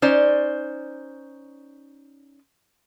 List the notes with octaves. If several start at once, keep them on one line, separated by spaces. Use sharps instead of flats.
C#4 D#4 C5 D5